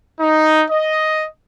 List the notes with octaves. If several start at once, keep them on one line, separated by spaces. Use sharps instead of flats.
D#4
D#5